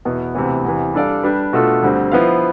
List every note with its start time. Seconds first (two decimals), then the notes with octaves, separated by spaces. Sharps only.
0.05 E2 B2 B3 E4
0.35 D2 C3 E3 B3
0.65 E2 C3 E3
0.94 G3 D4 A4 D5 F5
1.23 G3 D4 G4 B4
1.53 B2 A3 D4 F4 A4
1.83 D2 D3 G3 C4
2.11 F3 B3 E4 B4 F5